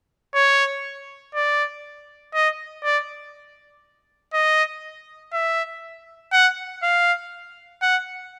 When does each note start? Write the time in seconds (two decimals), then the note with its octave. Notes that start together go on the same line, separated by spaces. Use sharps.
0.35 C#5
1.35 D5
2.34 D#5
2.84 D5
4.34 D#5
5.33 E5
6.32 F#5
6.83 F5
7.82 F#5